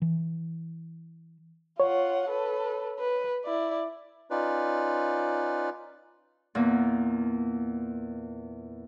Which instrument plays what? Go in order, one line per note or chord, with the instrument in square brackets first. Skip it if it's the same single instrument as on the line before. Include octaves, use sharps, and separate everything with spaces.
[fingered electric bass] E3
[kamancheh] F4 F#5 [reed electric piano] C#5
[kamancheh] A4 B4
B4
E4 D5
[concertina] C#4 D#4 F4 B4 D5
[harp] E2 A#2 A#3